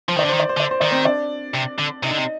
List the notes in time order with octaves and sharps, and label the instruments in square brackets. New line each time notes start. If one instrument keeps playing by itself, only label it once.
[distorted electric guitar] F3 [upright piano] C5
[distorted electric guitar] D#3 [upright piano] D5
[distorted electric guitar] D3
[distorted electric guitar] D#3 [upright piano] C5
[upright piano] D5
C5
[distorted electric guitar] D3
[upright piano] D5
C5
[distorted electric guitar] D#3 [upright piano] D5
[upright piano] C4 C5
D4 D5
[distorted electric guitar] C3
D3
[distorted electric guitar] C3 [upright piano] D#4 D#5
[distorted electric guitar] D3
C3